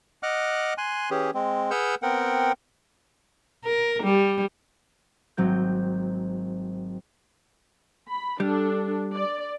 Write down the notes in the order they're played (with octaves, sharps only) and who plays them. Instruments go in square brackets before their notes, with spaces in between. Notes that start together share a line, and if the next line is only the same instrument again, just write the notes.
[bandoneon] D#5 F#5 D6 F6 F#6
G#5 C6 F#6
E3 C#4 G4 G#4
G#3 C4
G#4 B4 F#5 E6 F6 G6
B3 C4 A#4 F#5 G5
[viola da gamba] A#4
G3
[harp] G#1 F#3 C4 G6
[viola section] B5
[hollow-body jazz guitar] G3 [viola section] D4 A4
[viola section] D5